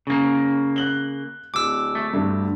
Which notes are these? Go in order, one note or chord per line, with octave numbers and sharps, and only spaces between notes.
C#3 A#3
F#6 F#7 G7
D1 D6 E6
A3
D2 G2 A3